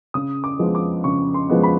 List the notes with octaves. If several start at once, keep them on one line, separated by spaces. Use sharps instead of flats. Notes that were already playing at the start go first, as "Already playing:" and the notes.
C#3 D#6
D6
F3 G#3 B3
D6
C#3 C#6
C6
F3 G#3 B3
B5